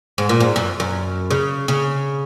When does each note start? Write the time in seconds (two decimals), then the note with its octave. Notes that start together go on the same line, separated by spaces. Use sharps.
0.18 G#2
0.29 A#2
0.40 G#2
0.56 F#2
0.80 F#2
1.31 C#3
1.68 C#3